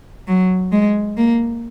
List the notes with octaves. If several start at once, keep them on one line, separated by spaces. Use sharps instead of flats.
F#3
G#3
A#3